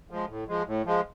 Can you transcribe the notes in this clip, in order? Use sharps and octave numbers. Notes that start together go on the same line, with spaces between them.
F3 G#3
A2
F3 G#3
A2
F3 G#3